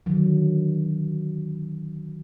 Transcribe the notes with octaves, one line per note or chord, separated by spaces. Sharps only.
D3 D#3 F#3